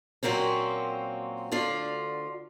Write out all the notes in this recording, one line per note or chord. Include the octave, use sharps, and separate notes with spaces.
A#2 F#3 A#3 C4 C#4
D2 D3 F4 D5